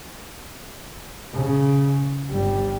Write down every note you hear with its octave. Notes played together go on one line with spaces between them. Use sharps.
C#3
G1 G3